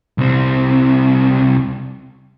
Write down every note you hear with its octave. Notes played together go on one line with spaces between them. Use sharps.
C2 C4